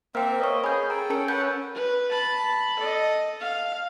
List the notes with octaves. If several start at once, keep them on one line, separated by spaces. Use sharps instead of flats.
A#3 C4 E5 G5 F6
B4 C#5 D#5 C#6
C#4 G#4 B5 G6
A4 G5 A#5
C#4 A#4 A5 C#7
A4 B4 F#5 G6
B4
A5 B5
A4 D#5
F5